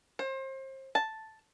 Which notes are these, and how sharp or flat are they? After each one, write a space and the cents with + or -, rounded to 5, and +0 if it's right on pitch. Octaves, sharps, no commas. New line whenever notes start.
C5 +30
A5 +0